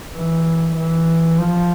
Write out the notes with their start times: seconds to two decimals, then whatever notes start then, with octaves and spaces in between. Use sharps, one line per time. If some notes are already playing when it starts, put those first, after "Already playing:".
0.15 E3
0.76 E3
1.37 F3